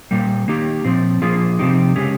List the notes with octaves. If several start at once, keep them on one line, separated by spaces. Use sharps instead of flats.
A#2 G3 A#3
D#3 A#3 D#4 G4
A#2 F3 C4
A#2 F3 A#3 F4 G#4
C3 F3 C4 D#4 G4
C#3 G#3 C#4 G4